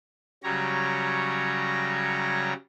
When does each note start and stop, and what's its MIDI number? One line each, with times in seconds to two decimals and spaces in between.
0.44 2.53 49
0.44 2.53 54
0.44 2.53 55
0.44 2.53 73
0.44 2.53 82